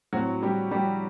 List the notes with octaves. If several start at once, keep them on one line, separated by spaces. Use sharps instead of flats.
A2 F#3 C4 F#4
G3 G4
G3 G4